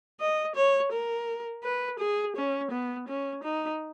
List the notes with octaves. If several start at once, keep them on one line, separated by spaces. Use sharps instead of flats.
D#5
C#5
A#4
B4
G#4
C#4
B3
C#4
D#4